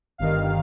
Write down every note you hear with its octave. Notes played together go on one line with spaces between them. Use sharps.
G1 G2 D#3 F5